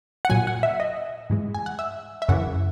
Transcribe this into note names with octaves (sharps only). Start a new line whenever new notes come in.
F#5
A#2 F#3 G#5
F#5
E5
D#5
G#2 E3 G#3
G#5
F#5
E5
E5
F#2 C#3 E3 F#5